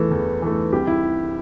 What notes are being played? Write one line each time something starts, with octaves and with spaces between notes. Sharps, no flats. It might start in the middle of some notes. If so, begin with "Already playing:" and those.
Already playing: E2 E3 A3 A4
E2
E3 A3
C2 G4
E4